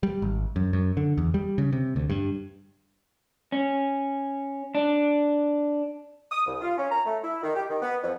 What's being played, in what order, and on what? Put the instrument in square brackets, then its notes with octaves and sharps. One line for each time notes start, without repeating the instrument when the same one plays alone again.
[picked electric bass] G3
G#1
F#2
F#2
D3
E2
G3
C#3
C3
D2
G2
[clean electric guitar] C#4
D4
[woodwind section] D#6
C2
F4
C#4
A#5
A3
E4
D#3
G4
D#3
B3
F2